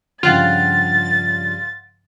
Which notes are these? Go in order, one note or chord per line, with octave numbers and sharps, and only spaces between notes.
G2 C#3 F3 F4 F#5 G5 A6